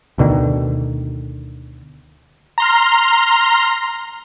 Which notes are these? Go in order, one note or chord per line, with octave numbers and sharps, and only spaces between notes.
D2 B2 D3 D#3
A#5 C6 F6